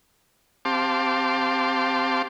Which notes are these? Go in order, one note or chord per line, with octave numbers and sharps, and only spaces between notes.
C4 G4 F5 A5 C6 D6